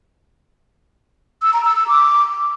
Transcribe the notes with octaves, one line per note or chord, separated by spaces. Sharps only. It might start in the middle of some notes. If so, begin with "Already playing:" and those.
E6
A#5
E6
E6
D6